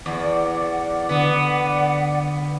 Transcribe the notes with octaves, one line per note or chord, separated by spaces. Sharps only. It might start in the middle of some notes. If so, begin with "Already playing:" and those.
E2 D5 F#5
D3 B3 F#5